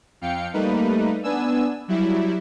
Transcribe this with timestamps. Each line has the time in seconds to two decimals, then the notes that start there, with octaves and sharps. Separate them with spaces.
0.21 F2 F5 G5 C#7
0.53 G3 A3 A#3 D#4 B4
1.23 B3 D4 G#5 E6
1.88 F#3 G3 E4